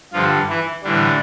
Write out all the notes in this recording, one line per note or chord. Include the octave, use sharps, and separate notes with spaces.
G2 D3 F3 G3 F4
E3 E4
A2 D3 E3 G3 D4